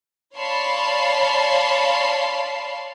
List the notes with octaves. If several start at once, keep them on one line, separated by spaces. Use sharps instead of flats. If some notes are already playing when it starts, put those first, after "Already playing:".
C#5 D5 F5 A5 B5 C6